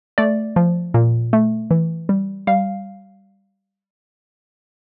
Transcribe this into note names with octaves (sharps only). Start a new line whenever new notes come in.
A3 D5
F3
A#2
A3
E3
G3
G3 F5